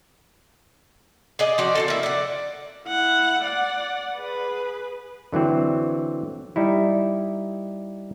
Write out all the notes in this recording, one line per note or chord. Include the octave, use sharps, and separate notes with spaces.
G#4 D5 D#5
F3 F#4 D5
D3 D#4 A4
A#3 E4
D5 F#5
E4 F#5
D5 F#5
G#4 B4
D3 E3 F#3 C4
G3 D#4 E4